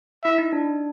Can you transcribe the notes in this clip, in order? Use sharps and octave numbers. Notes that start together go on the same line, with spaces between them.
E4 E5
D#4
D4